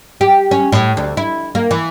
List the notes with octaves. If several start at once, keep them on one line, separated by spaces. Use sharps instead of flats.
G4
C#4
A2
D2
E4
A#3
E3